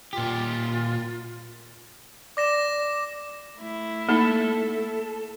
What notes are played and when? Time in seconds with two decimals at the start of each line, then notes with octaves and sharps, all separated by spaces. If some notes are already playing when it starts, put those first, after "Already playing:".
0.13 A#2 F4 G4
2.37 D5 D6 A#6 E7
3.60 A3 E4
4.09 A#3 D#4 A4